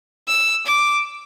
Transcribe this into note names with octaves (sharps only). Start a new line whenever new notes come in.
E6
D6